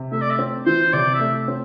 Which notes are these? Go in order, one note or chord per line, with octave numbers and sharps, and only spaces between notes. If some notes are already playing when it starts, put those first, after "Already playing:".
Already playing: C3
A3 E5
D5
E5
C4
E3 C5
C3 D5
E5
A3
C4